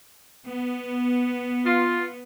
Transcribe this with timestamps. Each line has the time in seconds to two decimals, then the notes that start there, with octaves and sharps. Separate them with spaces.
0.47 B3
1.65 F4